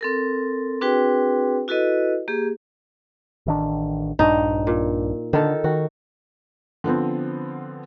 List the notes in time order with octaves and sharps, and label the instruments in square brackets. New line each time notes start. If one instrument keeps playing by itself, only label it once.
[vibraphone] C4 A4 A#4
C4 D4 F#4 G#4 B4 G5
E4 F#4 A4 B4 D#5
A#3 G4 G#4
[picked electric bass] A1 D#3 D4
[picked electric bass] A#1 G2 D4 [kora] D#4
[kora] A#2
[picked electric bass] D3 D4 [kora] D#3 A4
[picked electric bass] D#3 [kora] F#4
[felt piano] D3 F3 B3 C4